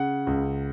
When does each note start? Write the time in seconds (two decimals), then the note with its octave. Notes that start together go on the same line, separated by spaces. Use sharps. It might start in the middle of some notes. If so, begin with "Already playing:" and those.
Already playing: C#3 F#5
0.27 C#2